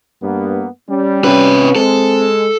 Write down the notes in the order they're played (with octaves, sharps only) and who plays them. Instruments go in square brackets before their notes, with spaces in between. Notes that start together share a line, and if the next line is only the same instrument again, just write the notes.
[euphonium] G2 [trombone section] A#3 B3
[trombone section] G3 [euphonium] C#4
[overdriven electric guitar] C3 B4 [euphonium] C#4
[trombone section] G#3 [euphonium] C4 [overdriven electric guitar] A4